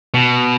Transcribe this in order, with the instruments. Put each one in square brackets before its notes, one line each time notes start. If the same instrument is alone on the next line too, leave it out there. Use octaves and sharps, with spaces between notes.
[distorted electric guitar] B2